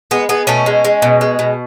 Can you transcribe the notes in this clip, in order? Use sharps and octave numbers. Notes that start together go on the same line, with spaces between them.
G#3 B3
G#3 B3
B2 A3 C#4
G#3
G#3
B2
G#3
B2